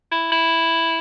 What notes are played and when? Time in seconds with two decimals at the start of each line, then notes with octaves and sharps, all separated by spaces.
0.11 E4
0.32 E4